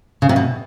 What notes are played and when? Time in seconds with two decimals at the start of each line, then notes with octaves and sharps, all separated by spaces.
0.22 C#3
0.29 C3
0.36 B2